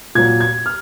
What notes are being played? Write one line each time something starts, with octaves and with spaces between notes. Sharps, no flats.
A#2 F#3 G#6
G#6
F6